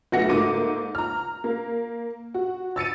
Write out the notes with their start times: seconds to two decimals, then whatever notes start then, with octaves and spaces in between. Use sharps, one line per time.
0.12 B1 A3 B3 F#5 A#6 C#7
0.29 G#2 A3 A#3 D6 D#7
0.95 A#5 F6
1.44 A#3
2.34 F#4
2.76 E6 A6 C#7 D#7